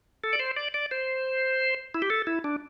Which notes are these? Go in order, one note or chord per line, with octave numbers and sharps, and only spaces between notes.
A4
D5
C5
D5
D5
C5
E4
G4
A4
E4
D4